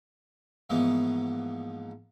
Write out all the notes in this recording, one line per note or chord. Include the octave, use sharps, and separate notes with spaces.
G#2 E3 F3 G#3 A#3 B3